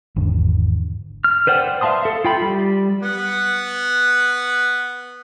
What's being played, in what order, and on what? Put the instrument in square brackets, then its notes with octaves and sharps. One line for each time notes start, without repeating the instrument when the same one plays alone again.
[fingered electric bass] G#1 E2 D3
[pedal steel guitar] F6
B4 C5 D5 F#5 G5
E5 F5 A5 C6 D#6
A4 E5
F4 G5 B5
G3
[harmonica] B3 F#5